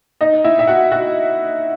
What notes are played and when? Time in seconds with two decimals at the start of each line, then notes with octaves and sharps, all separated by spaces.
0.21 D#4 D#5
0.44 E4 E5
0.59 E5
0.67 F#4 F#5
0.92 F#4 F#5